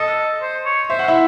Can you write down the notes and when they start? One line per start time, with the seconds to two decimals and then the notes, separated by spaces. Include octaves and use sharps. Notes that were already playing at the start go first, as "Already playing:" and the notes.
Already playing: A4 D#5 D#6
0.42 C5
0.65 C#5
0.90 C5 E5
0.99 F#5
1.08 E4 E5